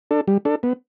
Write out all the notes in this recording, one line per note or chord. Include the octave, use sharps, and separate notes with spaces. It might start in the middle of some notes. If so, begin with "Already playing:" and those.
D4 A4
G3
D4 A4
B3